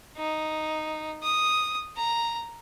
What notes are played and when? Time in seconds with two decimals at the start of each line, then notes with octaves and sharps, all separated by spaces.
0.17 D#4
1.23 D#6
1.97 A#5